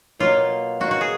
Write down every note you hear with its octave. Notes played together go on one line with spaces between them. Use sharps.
B2 F#3 A#3 F4
B2 A#3 F#4
F#4
G#4